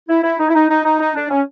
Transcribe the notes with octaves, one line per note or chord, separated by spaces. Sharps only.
E4
E4
D#4
E4
D#4
D#4
D#4
D#4
D4
C#4